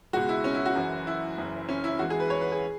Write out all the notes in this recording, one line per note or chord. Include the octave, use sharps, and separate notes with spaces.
C#2 B2 G#3 F#4
E4
C#4
E4
F#4
F#1 F#2 E3
E4
F#1 F#2 E3
C#4
E4
E2 E3 G#3 F#4
G#4
B4
C#5
B4
G#4